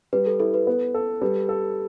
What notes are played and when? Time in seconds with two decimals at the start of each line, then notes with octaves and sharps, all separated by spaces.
0.13 G3 B4
0.26 A4
0.40 E4 A4
0.54 B4
0.67 B3
0.94 A4
1.22 G3 B4
1.49 A4